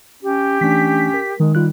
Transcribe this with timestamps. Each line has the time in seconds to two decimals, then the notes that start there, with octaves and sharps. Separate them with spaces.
0.23 C#4 G4
0.61 E3 A3 C#4 D4 B6
1.14 A#4
1.40 D#3 G#3
1.55 G3 F4 F#6